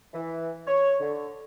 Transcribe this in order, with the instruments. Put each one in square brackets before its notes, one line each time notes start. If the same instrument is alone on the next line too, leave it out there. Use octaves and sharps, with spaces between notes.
[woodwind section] E3
C#5
D3